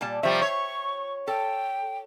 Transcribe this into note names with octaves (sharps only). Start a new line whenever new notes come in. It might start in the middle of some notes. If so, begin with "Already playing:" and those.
A#2 G3 A5
C3 F3 G3 E5 C#6
C#5
A4 G5